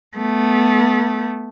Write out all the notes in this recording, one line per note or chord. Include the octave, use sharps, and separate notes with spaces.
A3 B3